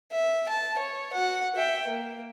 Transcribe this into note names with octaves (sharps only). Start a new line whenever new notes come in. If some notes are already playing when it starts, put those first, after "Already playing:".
E5
A5
C#5
F#4 F#5
E5 G5
A#3